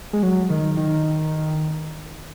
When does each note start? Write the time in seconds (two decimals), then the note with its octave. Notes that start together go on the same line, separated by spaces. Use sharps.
0.13 G#3
0.23 F#3
0.50 D#3
0.77 D#3